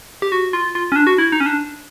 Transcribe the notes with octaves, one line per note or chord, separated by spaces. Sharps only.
G4
F#4
F4
F4
C#4
D4
F#4
E4
D#4
C#4
D4